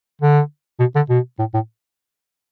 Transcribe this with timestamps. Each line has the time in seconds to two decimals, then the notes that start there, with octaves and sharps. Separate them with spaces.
0.21 D3
0.79 B2
0.95 D3
1.10 B2
1.39 A2
1.54 A2